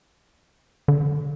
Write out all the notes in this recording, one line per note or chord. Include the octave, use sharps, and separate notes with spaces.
D3